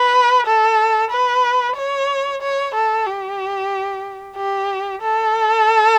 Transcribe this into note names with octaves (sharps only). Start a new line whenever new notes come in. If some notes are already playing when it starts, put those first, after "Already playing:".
Already playing: B4
A4
B4
C#5
C#5
A4
G4
G4
A4